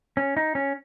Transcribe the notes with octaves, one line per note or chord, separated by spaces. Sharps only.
C#4
D#4
C#4